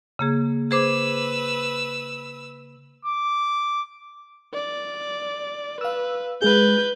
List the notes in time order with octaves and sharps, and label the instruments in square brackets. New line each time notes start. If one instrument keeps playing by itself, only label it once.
[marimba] C#3 A#3 G#4
[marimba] G#4 C5 D6 [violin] B4 E6
[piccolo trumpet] D6
[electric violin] D5
[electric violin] B4 [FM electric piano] F5 E6
[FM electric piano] G#3 G#4 [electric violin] B4 G6